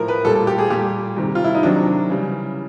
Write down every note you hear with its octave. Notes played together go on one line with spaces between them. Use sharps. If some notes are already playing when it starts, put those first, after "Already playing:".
Already playing: A2 F3 A#4
B4
A#2 G3 A4
A4
G4
G#4
A#2 G3 G4
C3 D#3 G3
F4
E4
D#4
C3 D#3 F#3 D4
C#3 E3 G3